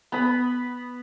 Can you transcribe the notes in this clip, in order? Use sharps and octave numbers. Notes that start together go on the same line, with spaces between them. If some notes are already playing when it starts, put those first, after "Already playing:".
B3 B5